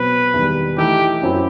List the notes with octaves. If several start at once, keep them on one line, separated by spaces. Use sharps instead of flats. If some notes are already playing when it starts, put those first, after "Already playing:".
Already playing: B2 F#3 C4 B4
E2 D#3 G3
E3 A3 D#4 G4 A4
F#2 F#3 C4 E4